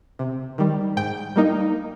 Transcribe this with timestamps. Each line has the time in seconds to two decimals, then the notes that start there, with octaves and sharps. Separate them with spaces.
0.19 C3
0.58 D#3 G3
0.97 G#2 G5
1.36 G3 A#3 D#4